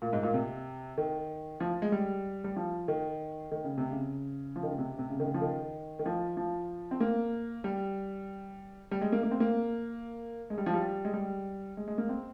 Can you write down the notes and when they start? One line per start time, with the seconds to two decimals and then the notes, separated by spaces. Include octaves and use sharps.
0.02 A#2
0.13 G#2
0.23 A#2
0.34 C3
0.98 D#3
1.60 F3
1.82 G#3
1.92 G3
2.44 G3
2.56 F3
2.88 D#3
3.51 D#3
3.64 C#3
3.78 C3
3.91 C#3
4.56 F3
4.63 D#3
4.71 C#3
4.78 C3
4.99 C3
5.10 C#3
5.20 D#3
5.26 C#3
5.34 F3
5.42 D#3
5.99 D#3
6.06 F3
6.37 F3
6.91 C4
7.00 A#3
7.64 G3
8.91 G3
9.01 G#3
9.12 A#3
9.23 A#3
9.31 C4
9.40 A#3
10.50 G#3
10.58 G3
10.66 F3
10.74 G3
11.05 G#3
11.13 G3
11.77 G#3
11.88 G#3
11.98 A#3
12.09 C4